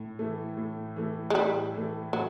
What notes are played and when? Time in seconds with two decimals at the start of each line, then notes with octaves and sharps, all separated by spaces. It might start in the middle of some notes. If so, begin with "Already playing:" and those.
Already playing: A2
0.19 E3 A3
0.57 A2
0.96 E3 A3
1.30 G#3
1.35 A2 G3
1.74 E3 A3
2.13 A2 F#3